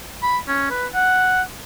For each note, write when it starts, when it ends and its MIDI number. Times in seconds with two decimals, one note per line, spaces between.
0.23 0.38 83
0.48 0.66 61
0.71 0.86 71
0.95 1.42 78